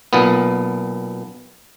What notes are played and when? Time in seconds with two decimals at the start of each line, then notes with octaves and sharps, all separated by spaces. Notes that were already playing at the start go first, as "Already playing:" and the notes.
0.13 B1 A#2 B3